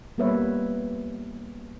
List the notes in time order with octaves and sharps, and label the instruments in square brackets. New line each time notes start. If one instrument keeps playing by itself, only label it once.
[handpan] G3 A#3 B3 B4 C#5 E5